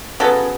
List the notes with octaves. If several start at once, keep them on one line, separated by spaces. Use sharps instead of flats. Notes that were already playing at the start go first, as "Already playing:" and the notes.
C#3 F#3 B3 A4